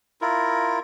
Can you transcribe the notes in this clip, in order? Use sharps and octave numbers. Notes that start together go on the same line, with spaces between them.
E4 F4 A#4